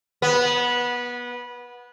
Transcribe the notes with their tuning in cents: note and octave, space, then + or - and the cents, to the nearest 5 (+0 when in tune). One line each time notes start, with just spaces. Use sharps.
B3 -20